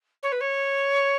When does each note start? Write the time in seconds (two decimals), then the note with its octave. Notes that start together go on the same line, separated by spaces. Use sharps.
0.23 C#5
0.32 B4
0.41 C#5